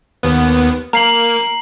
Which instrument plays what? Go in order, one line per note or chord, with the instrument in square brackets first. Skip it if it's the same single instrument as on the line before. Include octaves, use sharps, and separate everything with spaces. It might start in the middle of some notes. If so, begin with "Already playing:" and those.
[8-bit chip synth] D#2 B3
[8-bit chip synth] A#3 [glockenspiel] A#5 C7 F#7